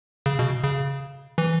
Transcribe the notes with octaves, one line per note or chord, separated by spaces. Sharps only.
C#3
B2
C#3
E3